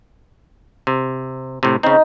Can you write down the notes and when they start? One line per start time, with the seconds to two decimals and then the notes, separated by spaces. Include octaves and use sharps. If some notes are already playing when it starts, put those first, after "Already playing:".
0.87 C3
1.63 A2 C3
1.83 C#3 C4 D#4